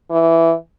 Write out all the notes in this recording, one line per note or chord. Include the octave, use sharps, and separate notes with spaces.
E3